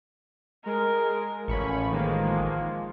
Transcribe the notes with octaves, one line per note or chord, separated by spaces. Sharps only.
G#3 A#4
A1 F3 C#4 B5 C#6
D#3 G#3 A#3